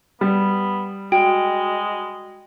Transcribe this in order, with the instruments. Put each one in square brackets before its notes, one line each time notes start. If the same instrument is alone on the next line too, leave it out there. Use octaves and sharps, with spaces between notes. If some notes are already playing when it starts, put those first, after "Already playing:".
[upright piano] G3 [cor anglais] B3
[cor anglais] G#3 [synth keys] F#4 [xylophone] G5